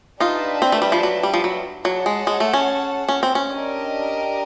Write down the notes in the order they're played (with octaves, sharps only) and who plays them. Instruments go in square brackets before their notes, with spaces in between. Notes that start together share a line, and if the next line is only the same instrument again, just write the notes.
[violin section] D4 G4 B4 E5 A5 [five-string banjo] D#4 F4
[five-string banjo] C4
A3
G3
F3
F#3
G3
F3
F#3
[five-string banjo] F#3 [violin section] G#4 C#5 F#5 A5
[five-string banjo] G#3
G#3
A3
C#4
C#4
C4
C#4
[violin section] D4 G4 A#4 D#5